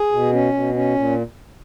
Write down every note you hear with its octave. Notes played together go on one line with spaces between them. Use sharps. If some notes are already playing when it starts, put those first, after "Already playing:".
Already playing: G#4
B2
C#4
B2
C#4
A#2